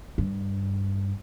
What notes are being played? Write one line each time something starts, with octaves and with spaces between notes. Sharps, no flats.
G2